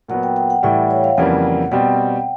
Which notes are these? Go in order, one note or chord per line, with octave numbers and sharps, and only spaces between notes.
A#2 F#3 B3 F#5
G5
G5
F#5
A2 E3 G3 E5
C#5
F5
F2 C#3 E3 G3 A#3 F#5
B2 G3 C4 G5